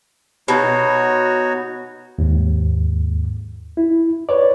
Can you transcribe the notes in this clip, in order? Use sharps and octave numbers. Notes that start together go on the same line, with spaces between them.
B2 D#4 F#4 C#5
D#2 G#2
E4
B4 C#5 D5